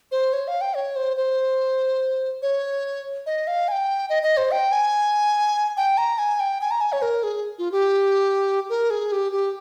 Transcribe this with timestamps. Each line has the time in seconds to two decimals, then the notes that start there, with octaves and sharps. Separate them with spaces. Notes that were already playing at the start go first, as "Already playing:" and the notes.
0.12 C5
0.33 C#5
0.48 F5
0.61 G5
0.74 C#5
0.96 C5
1.17 C5
2.42 C#5
3.26 D#5
3.47 F5
3.68 G#5
3.72 G5
4.10 D#5
4.23 D#5
4.37 C5
4.51 G5
4.72 G#5
5.77 G5
5.98 A#5
6.18 G#5
6.40 G5
6.61 G#5
6.71 A#5
6.81 G#5
6.92 C#5
7.02 A#4
7.23 G#4
7.59 F4
7.72 G4
8.70 A#4
8.90 G#4
9.12 G4
9.32 G4